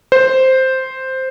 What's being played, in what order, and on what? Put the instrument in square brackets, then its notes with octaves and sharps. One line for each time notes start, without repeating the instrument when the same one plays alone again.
[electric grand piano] C5